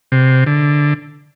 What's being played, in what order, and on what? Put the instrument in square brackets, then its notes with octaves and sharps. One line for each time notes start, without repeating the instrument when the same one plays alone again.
[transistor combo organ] C3
D3